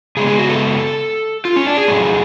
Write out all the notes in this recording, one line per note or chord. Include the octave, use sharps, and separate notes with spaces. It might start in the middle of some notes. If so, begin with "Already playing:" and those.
C#3 G#3 B3 G#4
G#4
F#4
A4
F4
C#4
D4
G#4
A2 F#3 A3